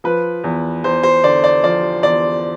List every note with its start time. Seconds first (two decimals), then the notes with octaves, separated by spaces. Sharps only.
0.04 F3 B4
0.44 E2
0.84 E2 C5
1.03 C5
1.24 D3 D5
1.44 D5
1.63 F3 D5
2.03 E2 D5